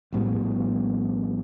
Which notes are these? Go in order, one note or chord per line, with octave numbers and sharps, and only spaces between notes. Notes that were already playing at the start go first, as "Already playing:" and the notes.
A#1 A2 G3 B3